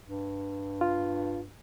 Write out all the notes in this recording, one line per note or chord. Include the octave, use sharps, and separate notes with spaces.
G2
F4